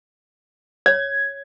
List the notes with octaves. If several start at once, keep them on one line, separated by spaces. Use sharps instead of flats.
C#5 G#6